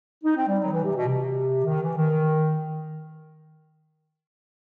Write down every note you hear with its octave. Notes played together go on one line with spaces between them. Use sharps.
D#4
C4
G3
F#3
D#3
E3
C3
B2
C3
D#3
E3
D#3